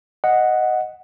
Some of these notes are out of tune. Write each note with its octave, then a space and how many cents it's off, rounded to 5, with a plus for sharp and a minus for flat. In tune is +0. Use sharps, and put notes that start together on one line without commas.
D#5 +0 F#5 +0